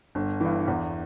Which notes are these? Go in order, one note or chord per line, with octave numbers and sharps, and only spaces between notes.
G1
G2 E3
E2